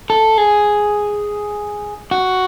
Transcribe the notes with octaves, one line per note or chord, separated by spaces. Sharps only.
A4
G#4
F#4